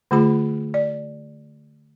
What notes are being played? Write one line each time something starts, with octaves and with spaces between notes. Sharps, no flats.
D3 A3 F4 G#4 B5
D5